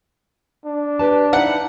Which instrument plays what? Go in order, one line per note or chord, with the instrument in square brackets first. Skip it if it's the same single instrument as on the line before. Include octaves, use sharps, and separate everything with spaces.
[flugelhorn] D4
[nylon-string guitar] G4 B4 A5
[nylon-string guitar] D#4 E4 [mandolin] F#5